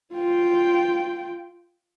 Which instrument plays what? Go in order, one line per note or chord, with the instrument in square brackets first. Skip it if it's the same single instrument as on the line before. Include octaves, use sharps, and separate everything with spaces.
[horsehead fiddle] F4 G5